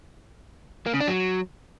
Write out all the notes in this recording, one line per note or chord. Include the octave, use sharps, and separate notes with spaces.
A#3
C#3
D4
F#3